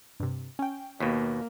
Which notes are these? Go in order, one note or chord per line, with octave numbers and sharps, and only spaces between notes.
G2 C3
C#4 G5
D#2 B2 A#3 B6